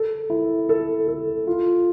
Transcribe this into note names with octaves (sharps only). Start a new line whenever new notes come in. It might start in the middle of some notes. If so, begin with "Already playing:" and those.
Already playing: A4
E4
A4
A4
F4